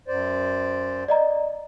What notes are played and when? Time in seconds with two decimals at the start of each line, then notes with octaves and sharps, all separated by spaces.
0.08 F#2 C5 D5
1.08 D5 D#5 A#5